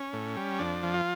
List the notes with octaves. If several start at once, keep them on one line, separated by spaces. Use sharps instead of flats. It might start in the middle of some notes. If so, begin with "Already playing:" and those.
Already playing: C#4
A2
G3
F2 D4
F3
F4